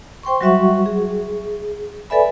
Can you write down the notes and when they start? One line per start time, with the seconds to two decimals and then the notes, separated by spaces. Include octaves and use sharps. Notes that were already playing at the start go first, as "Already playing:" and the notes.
0.23 C5 G5 C6 C#6
0.41 F#3 G3 F#4 E5 F#5 C#6
0.86 G#4
2.10 A4 B4 D5 E5 G#5 B5